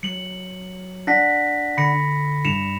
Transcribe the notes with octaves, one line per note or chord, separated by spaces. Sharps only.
F#3 C#7 F#7
D4 F#5 A#6 B6
D3 B5 A#6 C#7
G2 C#7 E7 F7